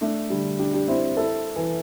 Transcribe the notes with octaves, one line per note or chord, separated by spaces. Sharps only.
A3 D4
D3 G3
D4 G4
D4 G4
C4 E4
E4 A4
E3